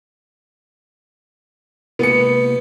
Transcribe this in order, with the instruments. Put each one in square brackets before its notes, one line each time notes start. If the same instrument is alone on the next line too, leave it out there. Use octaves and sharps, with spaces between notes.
[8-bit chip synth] C3 G#3 A#3 [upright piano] B3 C#7